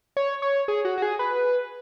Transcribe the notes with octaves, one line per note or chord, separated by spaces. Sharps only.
C#5
C#5
G#4
F#4
F#4
G#4
B4